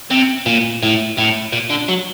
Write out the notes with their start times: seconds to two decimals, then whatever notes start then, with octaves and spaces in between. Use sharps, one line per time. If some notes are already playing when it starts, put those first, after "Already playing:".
0.11 C3
0.46 A#2
0.83 A2
1.18 A2
1.52 A#2
1.70 D3
1.88 F#3